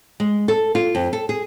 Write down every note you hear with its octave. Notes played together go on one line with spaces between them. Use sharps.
G#3
A4
F4
F2
A4
G#4